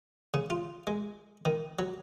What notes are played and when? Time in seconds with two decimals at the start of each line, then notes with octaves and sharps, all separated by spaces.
0.34 C#3
0.50 F4
0.87 G#3
1.45 D#3
1.79 F#3